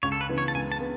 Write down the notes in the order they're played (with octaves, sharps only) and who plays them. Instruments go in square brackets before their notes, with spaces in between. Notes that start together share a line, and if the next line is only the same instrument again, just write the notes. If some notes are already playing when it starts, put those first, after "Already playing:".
[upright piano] C#2 [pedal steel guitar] C#5
[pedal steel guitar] A4
B4
[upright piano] C#3 E3 B3
[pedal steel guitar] C#5
A5
[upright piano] C#2 [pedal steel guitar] G#5
[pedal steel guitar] A5
[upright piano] B3